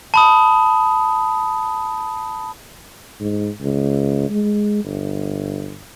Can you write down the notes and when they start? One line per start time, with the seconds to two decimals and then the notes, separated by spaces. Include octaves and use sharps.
0.14 A5 B5 D#6
3.20 G#2
3.61 C#2
4.30 G#3
4.84 G1